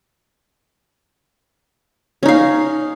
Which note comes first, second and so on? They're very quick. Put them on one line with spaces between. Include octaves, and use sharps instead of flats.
C#4 D#4 F5